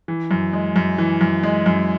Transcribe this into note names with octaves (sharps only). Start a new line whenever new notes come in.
E3
F#2
G#3
F#2
E3
F#2
G#3
F#2